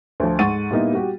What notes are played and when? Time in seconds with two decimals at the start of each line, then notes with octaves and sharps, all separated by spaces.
0.20 D2 F3
0.39 G#2 F#5 C#6 A6 D#7
0.71 A#2 G3 A#3 B3 D#4 E4
0.93 G3 F#4 G4